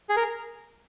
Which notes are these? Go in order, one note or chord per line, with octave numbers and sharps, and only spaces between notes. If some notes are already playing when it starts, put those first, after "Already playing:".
G#4
A#4